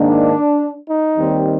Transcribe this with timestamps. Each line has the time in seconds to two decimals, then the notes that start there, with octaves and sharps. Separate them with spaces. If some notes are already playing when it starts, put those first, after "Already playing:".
Already playing: G#2 D#3 A#3 D4
0.86 D#4
1.18 D#2 D#3 G3 C4